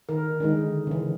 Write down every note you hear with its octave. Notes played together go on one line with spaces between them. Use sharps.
D#3 A#4
D3 D#3 G#3 D#4
C#3 E3